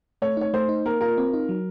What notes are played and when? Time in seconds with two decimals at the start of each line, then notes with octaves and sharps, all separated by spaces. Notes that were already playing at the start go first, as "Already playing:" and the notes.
0.22 A3 C#5
0.37 D#4 C#5
0.54 A3 C5
0.69 D#4
0.86 A#3 A#4
1.01 F4 A#4
1.18 C4
1.33 D#4
1.49 F#3